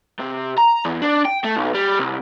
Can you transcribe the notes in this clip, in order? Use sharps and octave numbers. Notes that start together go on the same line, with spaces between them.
C3
A#5
E2
D4
G5
A3
B1
G3
C2